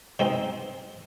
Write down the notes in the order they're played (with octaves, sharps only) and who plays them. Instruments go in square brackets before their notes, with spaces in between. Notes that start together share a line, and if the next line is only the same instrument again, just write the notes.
[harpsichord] B2 G#3 C4 D#4